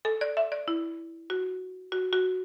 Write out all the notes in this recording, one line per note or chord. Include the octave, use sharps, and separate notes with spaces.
A4
D5
E5
D5
E4
F#4
F#4
F#4